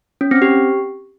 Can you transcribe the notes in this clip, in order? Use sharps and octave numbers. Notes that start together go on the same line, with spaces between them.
C#4
C4
G4